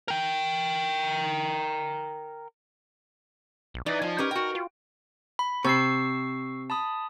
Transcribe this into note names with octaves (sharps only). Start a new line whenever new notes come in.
A#4 G5
B1
E3 D#4 D5
F3 G#5
C#4 G4 A#4 B4
F#4 G5
F4
B5
C3 C#6 E6 C7
A5 B5 D#6